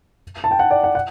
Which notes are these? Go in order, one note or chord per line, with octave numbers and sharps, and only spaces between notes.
A5
G5
F#5
D5
F#5
F#5